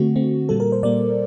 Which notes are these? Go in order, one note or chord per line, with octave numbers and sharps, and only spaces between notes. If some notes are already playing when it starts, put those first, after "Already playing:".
Already playing: D3 A3 C4 F#4
D3 A3 C4
A#2 G3 A#3 A4
A#4
C5
A#2 G3 A#3 D5